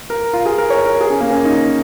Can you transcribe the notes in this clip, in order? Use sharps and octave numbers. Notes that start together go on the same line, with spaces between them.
A#4
F4
G#4
A#4
C#5
A#4
G#4
C#4
A#3
C#4
D#4